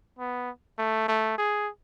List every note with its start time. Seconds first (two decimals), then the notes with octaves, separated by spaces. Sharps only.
0.19 B3
0.78 A3
1.08 A3
1.38 G#4